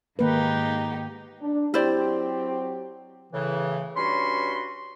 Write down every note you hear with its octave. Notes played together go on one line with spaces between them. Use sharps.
G#2 D#3 A#3 D#4 G4 B4
D4
F#3 C4 E4 G4 C5 D5
A2 C#3 E3
G2 C#4 F#4 B5 C6